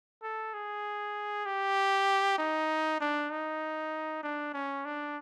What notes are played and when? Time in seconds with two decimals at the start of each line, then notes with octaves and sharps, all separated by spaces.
0.23 A4
0.54 G#4
1.46 G4
2.38 D#4
3.00 D4
3.30 D#4
4.23 D4
4.54 C#4
4.85 D4